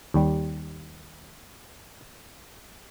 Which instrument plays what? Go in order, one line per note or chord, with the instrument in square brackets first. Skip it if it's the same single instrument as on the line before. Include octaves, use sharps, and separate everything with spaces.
[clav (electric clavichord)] D#2 G3